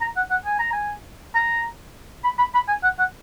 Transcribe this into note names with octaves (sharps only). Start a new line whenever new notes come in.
A#5
F#5
F#5
G#5
A#5
G#5
A#5
B5
B5
B5
G#5
F#5
F#5